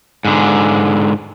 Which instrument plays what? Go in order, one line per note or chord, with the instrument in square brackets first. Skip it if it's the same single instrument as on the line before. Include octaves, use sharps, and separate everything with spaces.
[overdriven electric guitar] G#2 D3